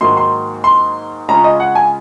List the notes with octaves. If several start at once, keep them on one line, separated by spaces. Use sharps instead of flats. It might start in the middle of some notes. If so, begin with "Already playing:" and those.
G#2 D#3 F#3 A#3 C6
C6
C6
C#3 G#3 C#4 F4 A#5
D#5
F#5
G#5